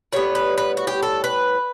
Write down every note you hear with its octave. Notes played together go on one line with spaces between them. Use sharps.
A2 G3 B3 C#5
B4
B4
F#4
G4
A4
B4